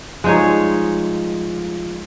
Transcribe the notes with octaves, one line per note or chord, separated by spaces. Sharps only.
F3 G3 G#3 D#4 F4 C#5